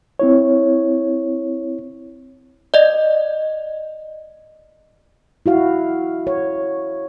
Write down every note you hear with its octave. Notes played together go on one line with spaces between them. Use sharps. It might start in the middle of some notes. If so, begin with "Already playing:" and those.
C4 E4 C#5
D5 D#5
E4 F#4 F5
C#5